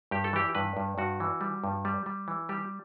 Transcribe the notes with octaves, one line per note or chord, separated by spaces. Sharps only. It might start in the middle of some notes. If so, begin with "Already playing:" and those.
G2 G4
A4
E3 G4
G2 B4
G2
G2 F#4
E3
G3
G2
G3
G3
E3
G3 G4